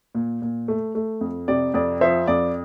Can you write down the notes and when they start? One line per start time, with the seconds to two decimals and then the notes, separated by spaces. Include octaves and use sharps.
0.15 A#2
0.42 A#2
0.68 A3
0.95 A3
1.21 F2
1.48 C3 D5
1.74 F2 D5
2.01 F3 C5 E5
2.27 F2 D5